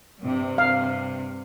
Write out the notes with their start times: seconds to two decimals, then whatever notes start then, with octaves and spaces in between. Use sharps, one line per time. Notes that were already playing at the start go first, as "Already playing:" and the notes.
0.23 G2 C3
0.58 F5